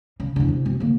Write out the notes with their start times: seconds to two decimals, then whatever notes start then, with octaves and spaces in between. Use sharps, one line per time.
0.20 C#3
0.36 E2 D3
0.48 C3
0.65 B2 C4
0.80 D3 A#3